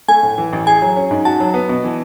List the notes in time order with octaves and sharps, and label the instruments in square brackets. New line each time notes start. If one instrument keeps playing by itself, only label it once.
[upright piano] A3 [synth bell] G#5
[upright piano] A2
E3
A1
[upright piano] G#4 [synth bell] G#5
[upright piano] F#3
C#4
G#2
[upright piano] F#4 [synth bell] A5
[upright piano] F#3
B3
B2
E3